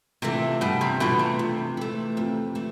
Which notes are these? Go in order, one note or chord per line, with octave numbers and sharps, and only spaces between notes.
C3 E3 A3 D4 F4
G2 B2
C3
B2 E3 A3 D4 F4
C3
F2
E3 A3
F2
E3 A3